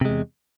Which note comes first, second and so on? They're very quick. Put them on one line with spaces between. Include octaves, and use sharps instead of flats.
C3 G#3 E2